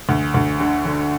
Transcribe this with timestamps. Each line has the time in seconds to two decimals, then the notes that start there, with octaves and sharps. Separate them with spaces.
0.09 D2
0.34 D2
0.60 D3
0.85 D3